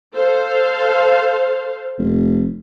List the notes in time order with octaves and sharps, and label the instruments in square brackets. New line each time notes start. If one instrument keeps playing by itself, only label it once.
[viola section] A4 C5 F5
[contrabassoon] F1